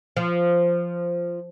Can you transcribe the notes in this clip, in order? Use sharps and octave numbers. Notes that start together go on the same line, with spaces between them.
F3